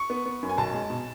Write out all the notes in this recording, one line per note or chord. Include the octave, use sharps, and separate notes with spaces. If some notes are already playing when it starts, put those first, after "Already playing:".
Already playing: C#6
B3
B3
F#2
G#5
B1 A5
G#3
B2